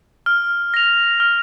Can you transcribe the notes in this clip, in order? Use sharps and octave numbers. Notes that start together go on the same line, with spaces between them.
F6
A#6 F7
F6